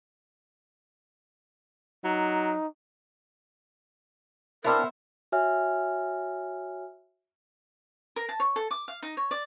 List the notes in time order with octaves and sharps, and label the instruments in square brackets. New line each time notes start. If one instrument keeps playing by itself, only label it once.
[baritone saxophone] F#3 [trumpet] D#4
[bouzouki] B3 C5 E5 [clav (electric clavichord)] C4 D4 E4 [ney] A#4
[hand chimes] F#4 C#5 E5 G#5 F6
[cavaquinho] A#4
A5
C#5
A4
D6
F5
D#4
C#5
D5